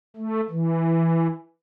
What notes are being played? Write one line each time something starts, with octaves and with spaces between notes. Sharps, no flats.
A3
E3